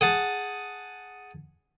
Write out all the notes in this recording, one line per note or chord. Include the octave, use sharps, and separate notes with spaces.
G#4 F#5 A5